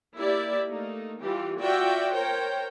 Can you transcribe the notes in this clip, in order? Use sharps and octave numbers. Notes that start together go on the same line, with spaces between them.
A#3 E4 G4 D5 E5
A3 A#3 D#4
E3 G3 F4 G4
F4 F#4 D5 E5 G5
A#4 C5 C#5 G5